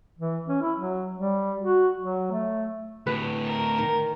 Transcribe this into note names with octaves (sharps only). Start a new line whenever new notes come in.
E3
C#4
E4
F#3
G3
F#4
F#3
A3
D2 A2 B4
A#4
D#3